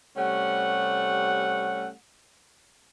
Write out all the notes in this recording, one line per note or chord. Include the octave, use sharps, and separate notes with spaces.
C3 G3 A3 C#4 F#5